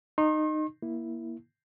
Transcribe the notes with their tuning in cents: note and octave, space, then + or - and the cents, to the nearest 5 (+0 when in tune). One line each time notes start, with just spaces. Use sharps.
D#4 -15 C6 +45
A#3 +20 E4 +0